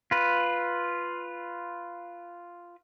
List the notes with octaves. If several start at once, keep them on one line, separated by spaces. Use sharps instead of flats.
F4 B4